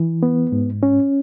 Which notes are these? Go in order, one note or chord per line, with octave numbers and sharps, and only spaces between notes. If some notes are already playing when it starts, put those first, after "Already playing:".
Already playing: E3
B3
G#2
C#4